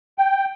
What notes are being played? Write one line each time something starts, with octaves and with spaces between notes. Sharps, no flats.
G5